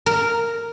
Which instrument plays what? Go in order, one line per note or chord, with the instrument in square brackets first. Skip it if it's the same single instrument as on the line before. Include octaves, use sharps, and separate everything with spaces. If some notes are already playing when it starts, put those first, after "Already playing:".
[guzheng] A#4